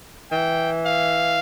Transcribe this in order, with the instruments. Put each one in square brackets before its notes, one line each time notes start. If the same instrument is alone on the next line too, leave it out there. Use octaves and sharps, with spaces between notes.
[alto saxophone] E3 [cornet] G5
[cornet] F5